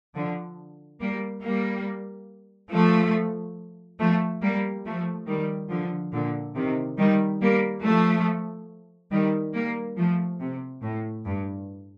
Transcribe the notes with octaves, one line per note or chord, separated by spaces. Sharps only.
D3 F3
G3 A#3
G3 A#3
F3 A3
F3 A3
G3 A#3
F3 A3
D#3 G3
D3 F3
A#2 D3
C3 D#3
D#3 G3
G3 A#3
F3 A3
D#3 G3
G3 A#3
F3 A3
C3
A2
G2